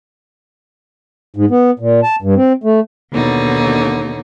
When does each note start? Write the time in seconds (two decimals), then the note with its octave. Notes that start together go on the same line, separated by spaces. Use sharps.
1.36 G#2
1.50 B3
1.79 A#2
2.03 A5
2.22 G2
2.36 C4
2.64 A3
3.11 D#2 B2 D3 D#4 C#5